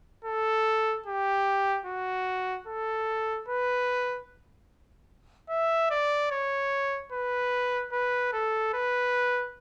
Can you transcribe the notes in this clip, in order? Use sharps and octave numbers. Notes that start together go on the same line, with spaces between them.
A4
G4
F#4
A4
B4
E5
D5
C#5
B4
B4
A4
B4